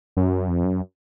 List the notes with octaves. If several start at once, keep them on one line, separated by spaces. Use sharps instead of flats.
F#2
F2
F#2